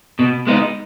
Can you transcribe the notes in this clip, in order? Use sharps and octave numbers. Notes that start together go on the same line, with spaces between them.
B2
G#3 B3 D#4